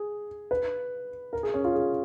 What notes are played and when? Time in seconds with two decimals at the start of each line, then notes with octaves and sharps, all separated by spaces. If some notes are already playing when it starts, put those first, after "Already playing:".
Already playing: G#4
0.51 B4
1.33 A#4
1.43 G#4
1.54 C#4
1.64 F4
1.75 G#4